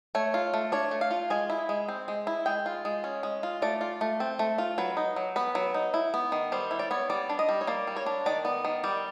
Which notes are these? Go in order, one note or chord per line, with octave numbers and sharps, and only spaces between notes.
A3 C#5
F4
A3
D4 C#5
A3
F5
F4
G#3 G#5
E4
G#3
C4
G#3
E4
G#3 G5
F4
G#3
C#4
G#3
F4
A3 D5
F4
A3
C4
A3
F4
F#3 B4
D#4
F#3
B3 B4
F#3
D#4
E4
B3
D#3
G3 C5
E4
D5
B3 C#5
G3 D5
D4
D#5
G3
C#5
A#3 D5
G3
C#5
D4
D#3 D5
B3
D#3
G3 D5